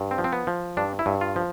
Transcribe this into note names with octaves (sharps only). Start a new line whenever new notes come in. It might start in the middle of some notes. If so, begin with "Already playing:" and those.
Already playing: G2
C4
F3
C4
B3
F3
G2 D4
E4
G2
F4
F3